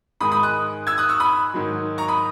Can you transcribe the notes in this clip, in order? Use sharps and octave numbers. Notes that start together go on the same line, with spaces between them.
G#2 D#3 G#3 B5 D#6
B5 D#6
D#6 F#6
E6 G#6
D#6 F#6
C#6 E6
B5 D#6
G#2 D#3 F#3
A#5 C#6
B5 D#6